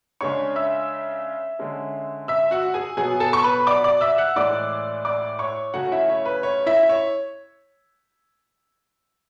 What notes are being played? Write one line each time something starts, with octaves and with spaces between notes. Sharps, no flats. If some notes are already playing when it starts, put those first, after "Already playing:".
C#3 G#3 D4 C#5 C#6
E5 E6
D3 G#3 C#4
E5 E6
F#4 F#5
G#4 G#5
B2 F#3 B3 G#4 G#5
A4 A5
C#6
B4 B5
D5 D6
D5 D6
E5 E6
F#5 F#6
A2 E3 G#3 D5 D6
D5 D6
C#5 C#6
C#3 F#3 A3 C#4 F#4 F#5
E4 E5
C#5
B4
C#5
E4 E5
C#5